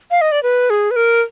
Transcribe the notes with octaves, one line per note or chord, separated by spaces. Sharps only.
F5
D#5
D5
B4
G#4
B4
A#4